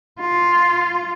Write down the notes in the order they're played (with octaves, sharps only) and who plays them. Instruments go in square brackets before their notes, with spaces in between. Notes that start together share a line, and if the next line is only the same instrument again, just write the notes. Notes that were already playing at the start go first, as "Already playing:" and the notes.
[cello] F4